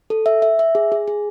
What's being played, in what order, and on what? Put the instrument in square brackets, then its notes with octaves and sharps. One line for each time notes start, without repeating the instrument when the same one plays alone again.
[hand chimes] A4
E5
E5
E5
G#4
G#4
G#4